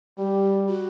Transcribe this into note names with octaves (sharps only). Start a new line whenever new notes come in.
G3 G4
F#4